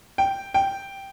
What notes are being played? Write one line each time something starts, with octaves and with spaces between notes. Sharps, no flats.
G5
G5